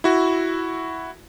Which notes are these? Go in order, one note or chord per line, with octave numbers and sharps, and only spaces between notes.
E4 F#4